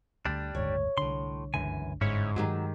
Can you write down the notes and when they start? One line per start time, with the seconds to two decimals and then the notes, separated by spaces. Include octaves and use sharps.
0.25 D2 D3 G3 D4
0.55 F#1 D2 G#2 C#5
0.98 C2 A2 D3 C6
1.54 G1 C#2 F#2 D3 E3 G#5
2.01 G1 G#2 C#4 E4 C#5
2.36 G2 D#3 F#3 G#3 G4 G#4